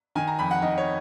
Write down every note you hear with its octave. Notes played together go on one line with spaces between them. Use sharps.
D#3 G#5
A#5
F2 B5
F#5
D#3 D#5
C#5